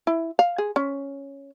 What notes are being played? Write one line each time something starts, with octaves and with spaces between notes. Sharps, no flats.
E4
F5
G#4
C#4